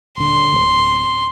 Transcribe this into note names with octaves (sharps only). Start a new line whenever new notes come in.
D#1 D3 C6
D1